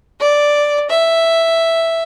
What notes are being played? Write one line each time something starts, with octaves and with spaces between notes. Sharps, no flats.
D5
E5